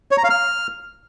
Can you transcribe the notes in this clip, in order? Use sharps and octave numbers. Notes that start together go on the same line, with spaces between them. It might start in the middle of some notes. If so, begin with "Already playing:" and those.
C#5
A#5
F5
F6